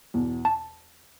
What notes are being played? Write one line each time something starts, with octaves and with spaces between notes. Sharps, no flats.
E2 B2
A5